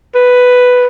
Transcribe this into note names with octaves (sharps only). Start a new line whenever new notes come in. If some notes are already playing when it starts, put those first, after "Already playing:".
B4